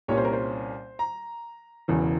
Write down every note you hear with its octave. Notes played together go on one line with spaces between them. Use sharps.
C2 A#2 G3 A#3 C#4 C#5
C5
A#4
C5
A#5
E1 E2 C#3 E3